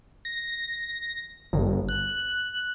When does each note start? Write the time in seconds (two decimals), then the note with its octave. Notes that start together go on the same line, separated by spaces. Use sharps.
0.25 A#6
1.53 G1
1.89 F#6